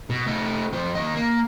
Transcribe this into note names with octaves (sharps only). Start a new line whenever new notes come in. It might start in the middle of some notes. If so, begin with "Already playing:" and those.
B2
A3 D#4
F2 C5
D#2 D#5
A#3